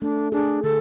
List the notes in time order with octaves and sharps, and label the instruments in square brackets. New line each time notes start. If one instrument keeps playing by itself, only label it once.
[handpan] A3 [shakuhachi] D4
[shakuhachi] D4 [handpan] G#4
[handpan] D3 [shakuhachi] A4